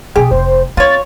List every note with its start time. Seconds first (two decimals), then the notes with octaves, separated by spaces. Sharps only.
0.16 F2 B2 G4 G#4
0.31 F1 C5
0.77 C4 F4 C#5 A6